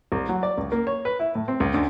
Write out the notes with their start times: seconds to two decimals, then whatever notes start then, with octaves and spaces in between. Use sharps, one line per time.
0.12 C2
0.29 F#3
0.43 D5
0.58 C#2
0.72 A#3
0.87 C#5
1.05 B4
1.19 E4
1.35 A2
1.48 C4
1.60 C#2
1.74 D2